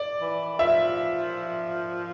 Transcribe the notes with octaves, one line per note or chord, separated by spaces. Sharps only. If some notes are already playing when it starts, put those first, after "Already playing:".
Already playing: D5
E3
F3 E5